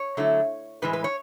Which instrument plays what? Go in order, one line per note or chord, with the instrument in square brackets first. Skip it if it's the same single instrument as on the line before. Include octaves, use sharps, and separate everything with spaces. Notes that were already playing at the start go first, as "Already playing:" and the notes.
Already playing: [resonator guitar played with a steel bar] C#5
D3 F#3 A3 E4
A2 E3 G#3 B4
B4
C#5